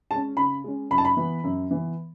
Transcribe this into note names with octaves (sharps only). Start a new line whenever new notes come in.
G#3 C#4 A5
C#3 B5
G#3 C#4
F#2 B5
A5
B5
E3 B3
F#2
E3 B3